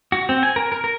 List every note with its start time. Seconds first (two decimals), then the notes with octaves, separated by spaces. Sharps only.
0.12 F#4
0.29 C4
0.43 G#5
0.56 A#4
0.72 A#4
0.84 A#4